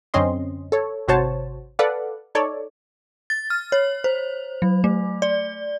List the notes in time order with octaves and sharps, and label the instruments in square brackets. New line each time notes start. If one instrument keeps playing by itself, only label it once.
[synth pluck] F#2 D3 C4 C#4 D#5 C6
A4 C#5
G#1 C3 F#4 C5 C#5 A5
A4 B4 D5 F5 F#5
D#4 A4 C#5 D5
[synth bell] A6
F6
C#5
C5
F#3
A3
D5